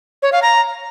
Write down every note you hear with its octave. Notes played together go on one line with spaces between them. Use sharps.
C#5
F5
A#5